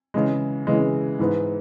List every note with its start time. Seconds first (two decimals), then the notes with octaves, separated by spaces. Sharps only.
0.14 C#3 E3 G#3
0.67 C#3 E3 G#3
1.19 G#2 E3 B3